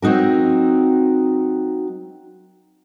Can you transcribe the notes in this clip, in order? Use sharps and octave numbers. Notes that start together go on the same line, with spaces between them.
F#3 C4 D#4 F#4 A#4